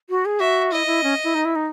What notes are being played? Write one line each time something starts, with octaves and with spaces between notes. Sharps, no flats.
F#4
G#4
F#4 E5
E4 D#5
E4
C#4
E4
D#4
E4
D#4